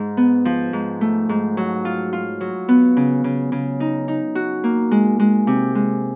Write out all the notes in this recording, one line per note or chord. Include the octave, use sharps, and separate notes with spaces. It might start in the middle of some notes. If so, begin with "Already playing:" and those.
Already playing: G#2
B3
F3
G#2
A3
G#2
F#3
F4
F4
F#3
B3
C#3
C#3
C#3
D#4
D#4
F#4
A#3
G#3
G#3
C3
G#3